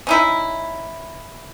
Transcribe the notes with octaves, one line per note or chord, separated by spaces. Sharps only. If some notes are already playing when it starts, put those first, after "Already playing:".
C#4 D#4 E4